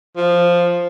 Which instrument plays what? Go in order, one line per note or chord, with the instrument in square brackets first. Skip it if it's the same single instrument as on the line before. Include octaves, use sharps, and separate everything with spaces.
[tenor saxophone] F3